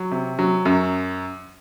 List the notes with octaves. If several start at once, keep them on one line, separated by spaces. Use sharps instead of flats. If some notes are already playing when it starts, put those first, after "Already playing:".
Already playing: F#3
C3
F#3
F#2